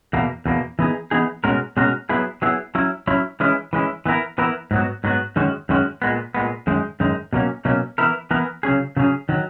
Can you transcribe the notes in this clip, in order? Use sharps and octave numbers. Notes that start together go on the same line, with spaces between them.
E2 B2 A#3
E2 B2 A#3
E3 B3 D#4 G#4
E3 B3 D#4 G#4
B2 G#3 C#4 F#4 A#4
B2 G#3 C#4 F#4 A#4
F#3 B3 E4 G#4
F#3 B3 E4 G#4
F#3 C#4 E4
F#3 C#4 E4
E3 G#3 C#4 E4
E3 G#3 C#4 E4
E3 B3 E4 A#4
E3 B3 E4 A#4
G#2 F#3 B3 F#4
G#2 F#3 B3 F#4
F#2 D#3 G#3 C#4 F#4
F#2 D#3 G#3 C#4 F#4
A#2 G#3 B3
A#2 G#3 B3
F#2 D#3 G#3 D#4
F#2 D#3 G#3 D#4
B2 F#3 A#3 C#4
B2 F#3 A#3 C#4
E3 B3 E4 A#4
E3 B3 E4 A#4
C#3 F#3 C#4 G#4
C#3 F#3 C#4 G#4
D#3 F#3